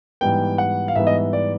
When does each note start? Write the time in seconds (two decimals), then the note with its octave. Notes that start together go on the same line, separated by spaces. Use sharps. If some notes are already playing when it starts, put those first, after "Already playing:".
0.21 G#2 E3 G3 B3 G5
0.58 F#5
0.88 F5
0.96 G#2 E3 G3 B3 E5
1.07 D#5
1.15 E5
1.33 D5